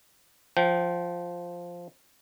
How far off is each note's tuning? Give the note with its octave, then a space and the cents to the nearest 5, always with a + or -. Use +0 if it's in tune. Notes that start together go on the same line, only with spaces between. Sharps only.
F3 +0 G5 -20